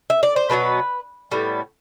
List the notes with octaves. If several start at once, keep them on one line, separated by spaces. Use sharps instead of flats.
E5
D5
C5
B2 F#3 B3 B4
A2 G3 B3